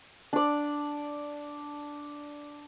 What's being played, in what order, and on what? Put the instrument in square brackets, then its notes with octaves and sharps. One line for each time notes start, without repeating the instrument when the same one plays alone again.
[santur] D4 D5